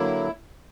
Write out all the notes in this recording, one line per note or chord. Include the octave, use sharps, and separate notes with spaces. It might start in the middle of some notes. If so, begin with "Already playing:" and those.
Already playing: D3 F#3 A#3 E4